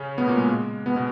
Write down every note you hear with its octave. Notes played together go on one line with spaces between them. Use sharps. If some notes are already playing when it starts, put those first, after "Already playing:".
Already playing: C#3 C#4
B2 B3
A#2 A#3
G#3
B2 B3
B2 B3